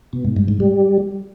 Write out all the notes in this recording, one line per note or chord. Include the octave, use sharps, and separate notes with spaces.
B2
G#2
G2
G#2
G3